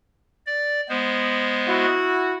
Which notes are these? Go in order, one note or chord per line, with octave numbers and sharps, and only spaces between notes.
D5
G#3 B3 C5
E4 F#4